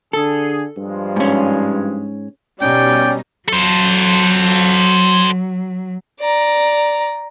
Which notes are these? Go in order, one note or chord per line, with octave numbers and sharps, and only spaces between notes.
D3 G#4 A4
G2 F3 G#3
G#2 C#4
B2 G3 C#4 D#4 D5 G5
F#3 A4 C5
D5 A#5